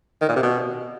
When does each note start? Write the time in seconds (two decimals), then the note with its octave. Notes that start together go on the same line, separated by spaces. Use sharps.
0.21 D#3
0.28 A#2
0.36 C3
0.43 B2